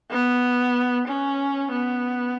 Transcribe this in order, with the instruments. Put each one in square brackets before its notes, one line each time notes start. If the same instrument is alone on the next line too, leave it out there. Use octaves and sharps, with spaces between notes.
[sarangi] B3
C#4
B3